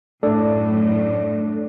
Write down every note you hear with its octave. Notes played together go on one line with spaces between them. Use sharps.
F#2 A2 A3 D4 A4 D5